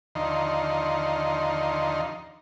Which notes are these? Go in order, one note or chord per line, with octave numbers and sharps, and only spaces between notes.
D#2 D3 D#3 F3 D#4 C6